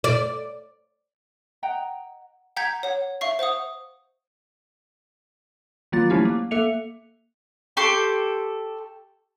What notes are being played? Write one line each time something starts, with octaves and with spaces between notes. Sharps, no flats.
D5
D#5 F#5 G5 A#5
F#5 G5 A#5 G6 G#6 B6
C#5 F#5
E5 F5 C#6 C7
C5 F5 F#5 D#6
D#3 F#3 A#3 F4 A6
F3 F#3 A3 C#4 E4 G4
A#3
A#3 A4 E5 C#7 F7
G4 A4 C6 C#6